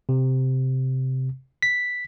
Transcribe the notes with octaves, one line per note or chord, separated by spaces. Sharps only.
C3
B6